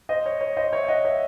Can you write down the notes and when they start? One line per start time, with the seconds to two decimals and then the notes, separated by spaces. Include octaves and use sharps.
0.09 C5 D#5
0.26 C#5
0.41 C#5
0.57 C5 D#5
0.73 C#5 E5
0.88 D#5 F#5
1.05 C#5 E5